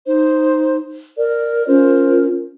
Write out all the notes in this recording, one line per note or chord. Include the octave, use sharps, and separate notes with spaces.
D#4 C5
A#4 D5
C#4 F4 A#4 C5